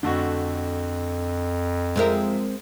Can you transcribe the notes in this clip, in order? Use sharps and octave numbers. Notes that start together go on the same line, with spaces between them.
F2 D3 A3 F#4
F3 G#3 C4 A#4 E5